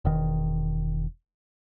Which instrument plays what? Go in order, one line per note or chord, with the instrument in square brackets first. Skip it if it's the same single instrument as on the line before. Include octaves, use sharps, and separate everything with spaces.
[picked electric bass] E1 D#3